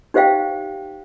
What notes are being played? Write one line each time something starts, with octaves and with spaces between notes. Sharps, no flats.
D#4 G4 C5 E5 F5 G5